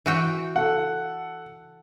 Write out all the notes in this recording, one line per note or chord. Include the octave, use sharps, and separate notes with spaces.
E3 F#4 G5
A4 F#5